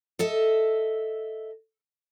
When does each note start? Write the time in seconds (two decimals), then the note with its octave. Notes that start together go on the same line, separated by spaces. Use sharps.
0.19 A4 D#5 E5